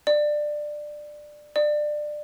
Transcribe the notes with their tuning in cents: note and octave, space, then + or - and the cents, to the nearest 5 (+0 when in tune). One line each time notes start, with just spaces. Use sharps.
D5 +15
D5 +20